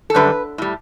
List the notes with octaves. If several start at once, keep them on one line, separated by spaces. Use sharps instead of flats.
A4
F#2 D3 G3 B4
A2 G3